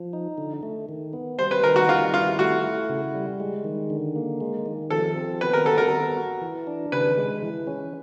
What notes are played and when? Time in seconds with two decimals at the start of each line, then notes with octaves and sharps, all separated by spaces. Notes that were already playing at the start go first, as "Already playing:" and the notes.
Already playing: F3
0.13 D#4
0.38 D3
0.63 A3
0.89 D#3
1.13 B3
1.39 G3 C5
1.51 B4
1.63 D#4 A#4
1.76 F#4
1.89 G3 F4
2.14 E4 F4
2.39 A3 F#4
2.64 E4
2.89 C#3
3.15 G3
3.40 G#3
3.64 D#3
3.90 D3
4.16 A#3
4.41 G#3
4.66 D#3
4.90 F3 A4
5.16 C4
5.41 B3 B4
5.53 A#4
5.66 F#4 A4
5.78 A#4
5.91 B3
6.17 F#4
6.42 E3
6.67 D4
6.92 C#3 B4
7.17 G#3
7.42 E3
7.67 C#4